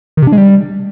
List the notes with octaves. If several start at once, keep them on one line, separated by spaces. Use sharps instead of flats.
D#3
C3
D4
G#3
G3